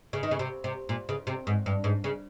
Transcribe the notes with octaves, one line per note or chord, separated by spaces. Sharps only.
C#3
D#3
C#3
C3
C3
A#2
C#3
C3
G#2
G2
G#2
C#3